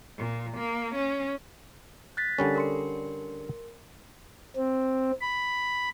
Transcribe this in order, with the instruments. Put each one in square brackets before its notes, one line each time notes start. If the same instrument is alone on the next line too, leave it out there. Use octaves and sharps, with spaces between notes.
[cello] A#2
A#3
C#4
[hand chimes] F#6 A6 B6
[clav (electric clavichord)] D3 G3 C#4 [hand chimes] A4 A#4
[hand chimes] A#4 C6 C#7
[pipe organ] C4
B5